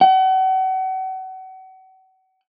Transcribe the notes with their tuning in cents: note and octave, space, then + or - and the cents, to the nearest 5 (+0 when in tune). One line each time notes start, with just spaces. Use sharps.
F#5 +35